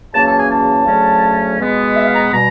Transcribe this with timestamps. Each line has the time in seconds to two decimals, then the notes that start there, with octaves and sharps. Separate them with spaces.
0.14 E2 C#3 F#3 A#3 C#4 A5
0.26 A5
0.38 G#5
0.50 A5
0.86 D2 C#3 F#3 A3 C#4
1.59 B2 G#3 B3
1.95 E5
2.05 F5
2.13 A#5
2.32 B2 G3 A#5